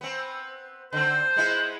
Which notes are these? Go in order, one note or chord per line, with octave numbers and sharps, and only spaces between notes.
B3 C4
D3 C4 C5
G#3 B3 E4